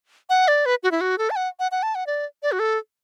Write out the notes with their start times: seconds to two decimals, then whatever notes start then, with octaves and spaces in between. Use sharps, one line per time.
0.29 F#5
0.48 D5
0.66 B4
0.83 F#4
0.91 E4
1.01 F#4
1.18 A4
1.30 A5
1.36 F#5
1.59 F#5
1.72 F#5
1.83 A5
1.95 F#5
2.07 D5
2.43 D5
2.52 F#4
2.59 A4